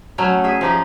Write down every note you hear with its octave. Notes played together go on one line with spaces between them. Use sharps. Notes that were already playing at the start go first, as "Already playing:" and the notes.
F#3 A3 C#4 C#5
G#4 E5
F3 D#4 G4